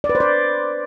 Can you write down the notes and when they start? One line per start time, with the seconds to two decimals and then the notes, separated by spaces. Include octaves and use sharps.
0.04 D5
0.09 B4
0.15 C5
0.20 D5